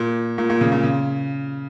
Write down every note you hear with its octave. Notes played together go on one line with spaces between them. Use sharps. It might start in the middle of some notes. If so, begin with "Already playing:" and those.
Already playing: A#2
A#2
A#2
C#3
A#2
C#3